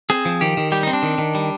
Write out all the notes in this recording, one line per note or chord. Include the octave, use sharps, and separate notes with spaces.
C4 G#4
F3
D#3 G4
D#3
G3 G4
C4 D#4
D4
D#3
D#3
G3